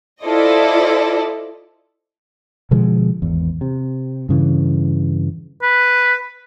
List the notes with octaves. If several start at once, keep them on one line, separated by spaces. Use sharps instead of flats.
E4 F4 A4 C5 D5 D#5
B2 D3 F3 G#3
G#1 E2
C3
G2 C#3 E3
B4